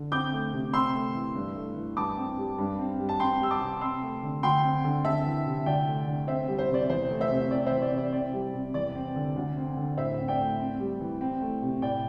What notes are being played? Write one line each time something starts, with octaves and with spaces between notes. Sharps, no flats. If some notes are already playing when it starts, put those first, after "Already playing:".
Already playing: D3
C4 D6 G6
A3
C3
C4 C6 E6
A3
E3
G2
A3
E3
G2 A5 D6
C4
G3
G2
C4
G3
A5
C4 G5 C6
G3 E6
A5 D6
C3
C4 C6 E6
A3
D3
D2 G5 C6
C4
D3
C4 E5 A5
E3
C3
D2 D5 G5
A3
D3
C4 C5 E5
G3
C5
C3
D5
E2 C5
A3
C5 E5
C3
C4 D5
E3 C5 E5
D5
C3
D5
C4 D5
G3
C3
E2 D5
C4
D3
D2
C4
D3
A2 C5 E5
C4
D5 G5
A3
C4
G3
E3
C4
A3
C3
A2 D5 G5